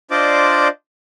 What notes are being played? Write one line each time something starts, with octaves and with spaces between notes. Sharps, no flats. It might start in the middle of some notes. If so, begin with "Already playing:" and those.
D4 F4 C5 D5 D#5 D6